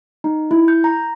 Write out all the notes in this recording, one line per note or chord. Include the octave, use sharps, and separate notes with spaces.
D#4
E4
G6
A#5